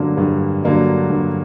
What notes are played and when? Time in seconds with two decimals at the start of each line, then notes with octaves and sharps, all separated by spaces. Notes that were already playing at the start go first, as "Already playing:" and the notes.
Already playing: G2 D3 F#3 A#3 D4
0.17 G2
0.64 D3 F#3 A#3 D4
1.10 G2